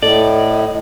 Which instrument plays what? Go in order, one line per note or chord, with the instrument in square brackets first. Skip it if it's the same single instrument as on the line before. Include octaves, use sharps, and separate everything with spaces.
[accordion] A2 [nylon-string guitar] A4 [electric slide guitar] D5 [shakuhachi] D#5